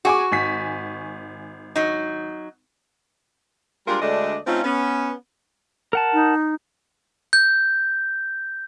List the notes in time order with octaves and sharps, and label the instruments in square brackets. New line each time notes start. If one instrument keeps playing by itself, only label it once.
[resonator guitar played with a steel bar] F#4 [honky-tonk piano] G#4 G#5 D6
[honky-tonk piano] G#1 G#5 B6
[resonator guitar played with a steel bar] F#3 D#4
[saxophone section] G3 G#3 D4 F4 A#4
D2 G#3 A3 D4 D5 D#5
A3 C4 C#4 D#4 F4
B3 C#4
[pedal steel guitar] A#4 F#5 A5
[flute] D#4
[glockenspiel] G6